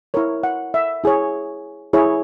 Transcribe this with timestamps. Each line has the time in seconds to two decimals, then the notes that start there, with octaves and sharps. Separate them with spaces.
0.14 E4 A#4 C#5
0.43 F#5
0.74 E5
1.04 E4 G#4 C#5
1.93 E4 G#4 C#5